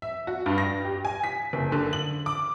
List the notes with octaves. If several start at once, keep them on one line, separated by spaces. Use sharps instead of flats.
E5
F#4
G2
A#6
G4
G#5
B6
F#1
D3
F#7
D6